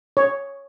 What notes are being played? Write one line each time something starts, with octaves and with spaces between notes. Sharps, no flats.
C#5